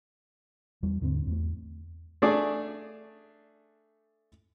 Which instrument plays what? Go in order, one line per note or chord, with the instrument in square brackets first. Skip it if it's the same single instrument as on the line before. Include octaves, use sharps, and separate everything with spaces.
[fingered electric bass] E2 G3
D#2 G#2 D3 C4
E2 A3
[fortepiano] A3 D4 G#4 D5